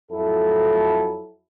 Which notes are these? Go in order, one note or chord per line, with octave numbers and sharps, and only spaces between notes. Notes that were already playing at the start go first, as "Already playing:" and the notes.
F2 F#3 E4 A4